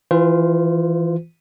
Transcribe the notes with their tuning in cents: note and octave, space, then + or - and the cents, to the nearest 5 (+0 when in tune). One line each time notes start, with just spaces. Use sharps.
E3 +0 F4 +0 C5 -40